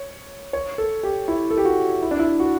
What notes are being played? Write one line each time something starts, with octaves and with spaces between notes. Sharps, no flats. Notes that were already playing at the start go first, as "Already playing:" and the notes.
Already playing: C#5
C#5
A4
G4
E4
A4
G4
F#4
E4
D4
E4
F#4